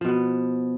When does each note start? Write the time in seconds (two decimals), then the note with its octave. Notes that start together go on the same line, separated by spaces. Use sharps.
0.01 F3
0.05 B2
0.08 B3